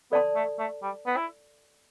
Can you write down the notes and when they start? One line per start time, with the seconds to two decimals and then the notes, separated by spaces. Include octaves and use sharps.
0.12 B3 A4 D5 A5 C6
0.35 A3
0.59 A3
0.82 G3
1.06 B3
1.17 E4